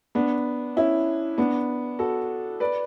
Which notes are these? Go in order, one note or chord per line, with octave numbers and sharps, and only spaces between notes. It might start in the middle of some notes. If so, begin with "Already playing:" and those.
B3 D4
C#4 E4
B3 D4
F#4 A4
B4 D5